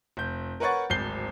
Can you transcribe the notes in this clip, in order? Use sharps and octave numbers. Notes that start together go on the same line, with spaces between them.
F1 G6
A#4 B4 C#5 F#5 C#6 A6
D1 G#1 G6 C7 G7